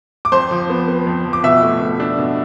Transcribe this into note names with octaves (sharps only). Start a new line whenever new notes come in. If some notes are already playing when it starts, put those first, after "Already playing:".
D6
F2 C5 C6
F3
B3
B3
F2
F3
D6
B2 E5 E6
A3
B2
D4
B2